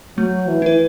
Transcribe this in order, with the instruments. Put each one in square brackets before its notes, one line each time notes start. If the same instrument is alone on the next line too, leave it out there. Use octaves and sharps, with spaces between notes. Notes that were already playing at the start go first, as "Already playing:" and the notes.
[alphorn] F#3 [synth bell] A3
[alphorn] E3
[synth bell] E4 B4